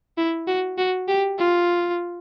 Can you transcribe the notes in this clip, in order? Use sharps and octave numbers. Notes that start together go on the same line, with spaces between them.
E4
F#4
F#4
G4
F4